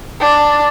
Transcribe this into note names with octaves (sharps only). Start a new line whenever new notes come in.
D4